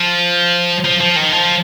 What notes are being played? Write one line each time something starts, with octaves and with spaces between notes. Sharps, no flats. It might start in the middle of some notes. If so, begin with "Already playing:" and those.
Already playing: F3
F3
F3
D#3
F3